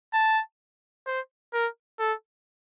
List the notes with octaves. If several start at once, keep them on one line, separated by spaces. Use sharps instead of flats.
A5
C5
A#4
A4